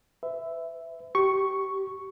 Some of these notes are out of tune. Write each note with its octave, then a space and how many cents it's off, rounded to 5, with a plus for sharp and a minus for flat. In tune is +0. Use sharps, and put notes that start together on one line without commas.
B4 +35 E5 +0
G4 -25 C#6 +0